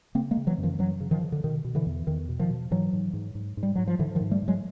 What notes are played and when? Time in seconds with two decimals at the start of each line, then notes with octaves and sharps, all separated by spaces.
0.15 C#3 A#3 C4
0.31 G#3 A#3
0.37 C#3
0.47 E3 F#3
0.58 F#2
0.63 D#3 F3
0.79 F#2 E3 F#3
1.00 C#3
1.11 D#3 F3
1.22 C#3
1.32 D3
1.44 B2 D#3
1.64 B2
1.75 D3 E3
1.86 E2
2.07 E2 D#3
2.28 B2
2.39 D#3 F3
2.50 B2
2.71 G#2 E3 F#3
2.93 G#2
3.13 G#2
3.35 G#2
3.57 G#2
3.63 G3
3.76 G#2 F#3
3.87 F3
3.99 G#2 D3 E3
4.15 D#3 F3
4.21 G#2
4.31 G3 A3
4.42 G#2
4.48 F#3 G#3